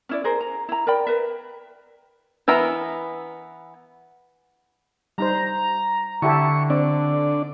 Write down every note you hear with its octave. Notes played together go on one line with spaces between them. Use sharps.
C#4 E4 D5
G#4 A#4 C5
A#5
E4 A#5
A#4 D5 G5 B5
A#4 B4 E5
E3 B3 A#4 E5 A#5
G3 D#4 C5 A#5
D3 E4 G4 A4 C#6
C4 D4 D5